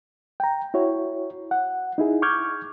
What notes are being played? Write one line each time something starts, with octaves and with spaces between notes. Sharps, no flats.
G5 A#5
E4 F#4 C#5
F#5
D#4 E4 G#4
C#6 D6 F6 G6 G#6